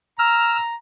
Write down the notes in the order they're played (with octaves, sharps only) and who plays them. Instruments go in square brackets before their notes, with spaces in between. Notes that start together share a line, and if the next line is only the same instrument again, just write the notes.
[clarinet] A#5 [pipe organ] E6 F6